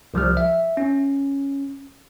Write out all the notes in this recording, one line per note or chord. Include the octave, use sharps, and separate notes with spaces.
C2 F3 G3 F6
E5
C#4